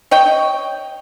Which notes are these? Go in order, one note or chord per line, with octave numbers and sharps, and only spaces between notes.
C#5 D#5 G5